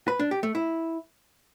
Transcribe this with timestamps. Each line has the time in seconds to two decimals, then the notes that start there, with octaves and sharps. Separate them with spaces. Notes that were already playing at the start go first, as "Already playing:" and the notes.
0.08 B4
0.19 D4
0.31 G4
0.43 A3
0.55 E4